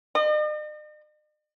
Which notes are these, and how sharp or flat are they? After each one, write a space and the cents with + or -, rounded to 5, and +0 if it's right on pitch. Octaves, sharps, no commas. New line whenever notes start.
D#5 -45